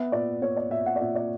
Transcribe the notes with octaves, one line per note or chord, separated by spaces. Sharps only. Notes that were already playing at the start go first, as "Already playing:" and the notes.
Already playing: B3 E5
A#2 D5
B3 C#5
D5
A#2 E5
F#5
D5
A#2 E5
D5